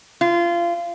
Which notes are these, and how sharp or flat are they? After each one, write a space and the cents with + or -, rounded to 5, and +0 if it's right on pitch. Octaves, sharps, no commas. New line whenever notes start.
F4 -25